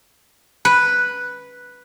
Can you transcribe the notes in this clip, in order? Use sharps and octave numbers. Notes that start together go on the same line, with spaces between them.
B4